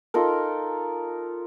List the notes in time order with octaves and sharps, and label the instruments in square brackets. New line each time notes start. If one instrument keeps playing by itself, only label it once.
[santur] D#4 F4 A4 A#4